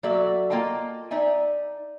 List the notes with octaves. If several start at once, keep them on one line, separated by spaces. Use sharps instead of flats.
F#3 A#3 F#4 A4 D5 E5
A#3 F4 D#5 G5 A5
D#4 D5 E5 G#5